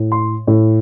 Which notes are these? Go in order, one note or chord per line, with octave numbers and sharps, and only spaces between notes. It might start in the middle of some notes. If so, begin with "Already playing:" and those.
Already playing: A2
C6
A2